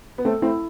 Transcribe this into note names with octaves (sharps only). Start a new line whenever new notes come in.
B3
A3 C4 A4
A3 C4 E4